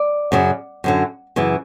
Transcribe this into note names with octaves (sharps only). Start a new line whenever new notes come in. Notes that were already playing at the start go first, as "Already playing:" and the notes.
Already playing: D5
F#2 C#3 F#3
F#2 D3 F#3
F#2 C#3 E3